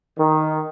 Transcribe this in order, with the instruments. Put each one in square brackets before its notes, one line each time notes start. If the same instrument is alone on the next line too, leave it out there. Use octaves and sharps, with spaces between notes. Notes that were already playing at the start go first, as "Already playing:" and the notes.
[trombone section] D#3